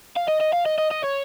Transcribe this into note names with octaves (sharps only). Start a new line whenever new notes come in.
F5
D#5
D#5
F5
D#5
D#5
D#5
C#5